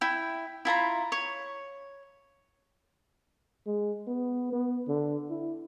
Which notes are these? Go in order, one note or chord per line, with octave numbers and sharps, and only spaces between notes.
E4 G5
E4 F4 A#5 B5
C#5
G#3
B3
B3
D3
E4